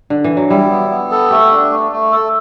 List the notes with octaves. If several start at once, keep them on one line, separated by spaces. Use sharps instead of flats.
D3
E3
F#3
G3 E4
B3
B3
A4
A3 G4
D4
A3
A3
A4